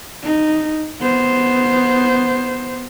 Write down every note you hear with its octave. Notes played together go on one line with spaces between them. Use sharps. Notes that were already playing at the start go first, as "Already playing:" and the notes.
D#4
B3 C5